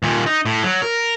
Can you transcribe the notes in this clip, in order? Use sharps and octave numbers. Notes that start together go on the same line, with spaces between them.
D#2 A#2
D#4
A2
F#3
A#4